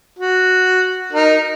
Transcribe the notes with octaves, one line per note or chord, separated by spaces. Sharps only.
F#4
D#4 A#4